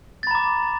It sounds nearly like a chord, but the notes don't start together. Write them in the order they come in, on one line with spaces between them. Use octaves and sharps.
A6 B5 A#5 D6